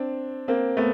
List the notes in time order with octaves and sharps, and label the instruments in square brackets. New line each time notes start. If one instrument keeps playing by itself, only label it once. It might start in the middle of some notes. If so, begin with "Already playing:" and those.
Already playing: [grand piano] C4 D4
A#3 C4
A3 B3